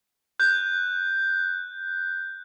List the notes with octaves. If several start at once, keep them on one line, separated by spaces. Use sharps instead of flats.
F#6 G6